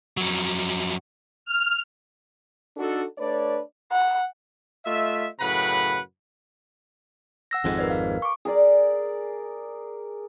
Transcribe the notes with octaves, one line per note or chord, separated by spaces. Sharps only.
F2 F#3
F6
D4 D#4 F#4 A4
A3 D4 B4 C#5 D5
F#5
A3 F4 D#5 E5
F#2 A2 C#3 B4 F#5 B5
F#5 E6 A#6
G#1 F2 G#2
A#4 B4 D5
F5
C#6 D6
G#4 A#4 D5